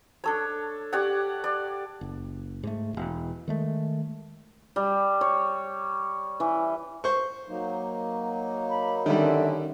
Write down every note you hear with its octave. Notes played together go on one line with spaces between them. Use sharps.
D4 A4 C#5
G4 C#5 D5 F#5
D5
F#1
G#2 A3
E1 B1
D#3 G#3 A3
G3
C#5
E3
C5 C#6
F#3 A#3 D#4
B5
F#2 D3 D#3 G3 E5